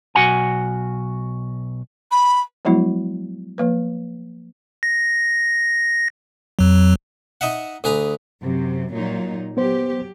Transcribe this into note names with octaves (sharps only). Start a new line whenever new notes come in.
B1 F#4 F#5 G#5
B5
F3 F#3 G#3 B3 E4 F#4
F3 A#3 B4
A#6
F2 F#3
D#4 D#5 E5 F#5
D2 G#4 B4 A#5
F#2 C3
A#2 F#3 D#4
F#3 B3 G4 C5